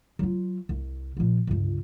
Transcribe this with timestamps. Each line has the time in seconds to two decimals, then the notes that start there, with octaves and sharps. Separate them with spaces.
0.19 F#3 F4
0.69 C2
1.17 A#2 F3
1.47 G1 C#2